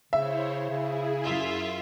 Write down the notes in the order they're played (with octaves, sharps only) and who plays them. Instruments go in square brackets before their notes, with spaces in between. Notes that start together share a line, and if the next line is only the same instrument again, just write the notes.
[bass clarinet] C#3 [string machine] E4 C5 C#5 [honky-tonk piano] E5
[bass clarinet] C#3 [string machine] E4 G#4
[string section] F#2 F4 E5